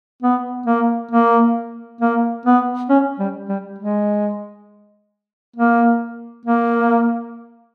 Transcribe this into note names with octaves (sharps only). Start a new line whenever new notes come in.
B3
A#3
A#3
A#3
B3
C#4
G3
G3
G#3
A#3
A#3